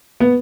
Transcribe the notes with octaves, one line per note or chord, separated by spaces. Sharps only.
B3